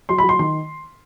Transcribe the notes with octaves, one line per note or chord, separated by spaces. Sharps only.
F#3 C6
B5
F#3
C6
D#3 C6